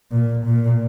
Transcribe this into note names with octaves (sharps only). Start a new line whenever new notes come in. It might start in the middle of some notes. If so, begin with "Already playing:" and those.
A#2
A#2